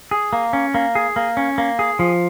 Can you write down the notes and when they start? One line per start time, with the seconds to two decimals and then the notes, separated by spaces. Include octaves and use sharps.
0.11 G#4
0.33 A#3
0.53 C#4
0.74 A#3
0.95 G#4
1.16 A#3
1.37 C#4
1.58 A#3
1.79 G#4
1.99 F3